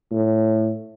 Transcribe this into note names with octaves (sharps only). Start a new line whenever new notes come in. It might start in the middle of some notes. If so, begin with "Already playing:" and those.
A2